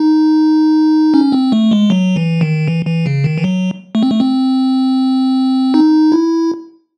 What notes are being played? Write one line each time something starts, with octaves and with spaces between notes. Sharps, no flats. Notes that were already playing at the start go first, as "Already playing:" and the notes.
Already playing: D#4
C#4
C4
A3
G#3
F#3
E3
D#3
E3
E3
C#3
D#3
E3
F#3
A3
C4
A3
C4
D#4
E4